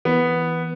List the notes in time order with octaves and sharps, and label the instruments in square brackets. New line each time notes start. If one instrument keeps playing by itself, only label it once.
[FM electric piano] E3 [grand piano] B3